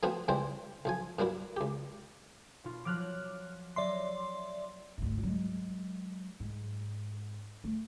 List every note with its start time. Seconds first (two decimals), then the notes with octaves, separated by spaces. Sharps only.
0.03 F3 A3 B3 C4 F4 F#4
0.28 C#2 E3 G3 C4 C5
0.85 B1 F3 G#5
1.19 G2 F#3 A#3 E4 F#4
1.57 C#2 G4
2.64 B2 F4
2.85 F3 F#3 D6 F6 F#6
3.76 F#3 D5 E5 C6 C7
4.98 G#1 D2
5.23 F#3 G#3
6.40 G#2
7.64 A3